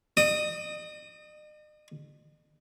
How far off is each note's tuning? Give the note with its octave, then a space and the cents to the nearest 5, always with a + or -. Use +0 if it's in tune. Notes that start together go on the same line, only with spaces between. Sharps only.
D#5 -45 D#6 +0